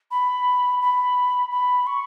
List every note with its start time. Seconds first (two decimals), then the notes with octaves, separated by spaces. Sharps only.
0.11 B5
0.82 B5
1.51 B5
1.87 C#6